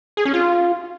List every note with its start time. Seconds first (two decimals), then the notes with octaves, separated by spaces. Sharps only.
0.17 G#4
0.25 C#4
0.34 F4